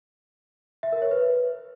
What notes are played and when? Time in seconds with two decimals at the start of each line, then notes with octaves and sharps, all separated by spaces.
0.83 E5
0.92 A#4
1.02 C#5
1.11 B4